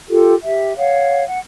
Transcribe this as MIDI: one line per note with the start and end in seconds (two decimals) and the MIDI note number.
0.08 0.33 65
0.08 0.33 67
0.08 0.33 69
0.08 0.33 70
0.43 0.76 67
0.43 0.76 76
0.76 1.22 73
0.76 1.22 77
0.76 1.22 78
1.27 1.39 78